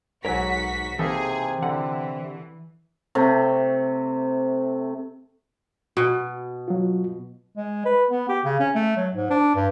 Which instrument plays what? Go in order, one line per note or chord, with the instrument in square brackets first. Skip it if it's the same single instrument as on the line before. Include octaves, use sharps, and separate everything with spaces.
[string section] B1 F#4 B6 [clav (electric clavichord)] G#2 F#3 [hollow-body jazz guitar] A#4 C#5 G#5
[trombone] C3 [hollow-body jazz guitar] E3 [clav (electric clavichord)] A#3 D#4 A4 [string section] G#4
[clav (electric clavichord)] D3 [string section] E3 [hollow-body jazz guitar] F#5
[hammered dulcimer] C3 A3
[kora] B2
[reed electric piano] F#3 F4
[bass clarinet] G#3
B4
B3
G4
C#3
C#4
A3
F#3
G#2
D4
G2